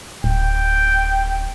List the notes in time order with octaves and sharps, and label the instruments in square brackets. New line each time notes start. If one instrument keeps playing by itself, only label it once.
[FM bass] D1 [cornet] G5